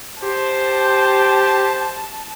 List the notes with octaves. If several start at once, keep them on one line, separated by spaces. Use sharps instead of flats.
G4 C5 A5